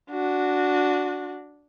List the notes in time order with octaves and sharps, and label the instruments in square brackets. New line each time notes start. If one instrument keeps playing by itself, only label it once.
[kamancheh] D4 F#4